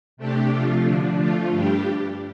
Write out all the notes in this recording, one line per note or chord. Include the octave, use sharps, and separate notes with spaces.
C3 A3 D4 G4
C3 F3 A3 F4
D3 F3 D4
F3 A3 F4
G2 G3 D4 G4